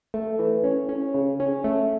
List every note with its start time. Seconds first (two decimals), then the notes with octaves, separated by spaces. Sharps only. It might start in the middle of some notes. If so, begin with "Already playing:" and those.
0.14 A3
0.39 E3
0.64 C#4
0.89 C#4
1.14 C#3
1.40 C#4
1.64 A3